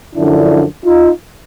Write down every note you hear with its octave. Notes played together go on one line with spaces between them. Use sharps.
F#2 D3 F3 D4 E4
D#4 F4